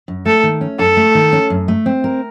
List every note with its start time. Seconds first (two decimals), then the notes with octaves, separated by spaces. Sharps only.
0.08 F#2
0.26 A3 A4
0.43 D#3
0.61 C#4
0.79 F#2 A4
0.97 A3
1.15 D#3
1.33 C#4
1.50 F#2
1.68 A3
1.86 C4
2.04 A#4